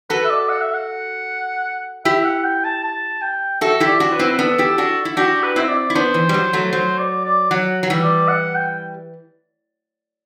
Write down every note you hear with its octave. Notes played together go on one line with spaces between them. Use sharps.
F#4 A4 B4
E5
D5
F#5
E5
F#5
E4 G4 E5
F#5
G5
A5
A5
G5
F#4 A4 E5
E4 G4
D5
D4 F#4
B4
C4 E4
B4
B3 D4 A4
E4 G4
D4 F#4
E4
D4 F#4 G4
B4
C4 E4 E5
D5
E4
B3 D4 C5
E3
G3
F#3
F#3 A3
F#3 C5
D5
D5
F#3 F#5
F#3
E3 G3
D5
F#5
G5